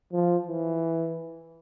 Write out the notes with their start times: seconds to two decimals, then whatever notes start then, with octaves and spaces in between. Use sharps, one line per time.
0.13 F3
0.47 E3